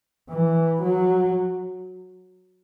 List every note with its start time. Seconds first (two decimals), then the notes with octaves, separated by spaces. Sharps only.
0.29 E3
0.82 F#3